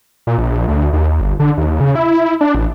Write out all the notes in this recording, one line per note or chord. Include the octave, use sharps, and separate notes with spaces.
A#2
A#1
D2
D#2
G1
D3
D#2
C#3
E4
D4
A1